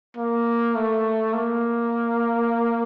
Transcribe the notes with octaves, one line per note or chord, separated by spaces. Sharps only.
A#3
A3
A#3